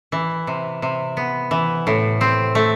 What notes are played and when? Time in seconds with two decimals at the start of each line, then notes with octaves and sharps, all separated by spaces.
0.12 E3
0.47 C3
0.82 C3
1.17 B3
1.51 E3
1.87 A2
2.21 C4
2.55 A3